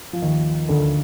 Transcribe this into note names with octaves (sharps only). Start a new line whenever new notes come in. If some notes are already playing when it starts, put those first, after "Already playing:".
F3
D#2 D#3
D2 D3